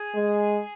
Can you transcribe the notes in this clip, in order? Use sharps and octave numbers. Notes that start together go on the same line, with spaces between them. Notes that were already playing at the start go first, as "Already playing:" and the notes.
Already playing: G#4
G#3